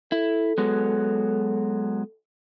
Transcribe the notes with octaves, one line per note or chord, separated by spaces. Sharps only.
E4 A4
F#3 G#3 B3